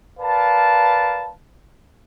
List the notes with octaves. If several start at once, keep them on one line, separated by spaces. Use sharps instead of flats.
A#4 B4 D5 F5 A5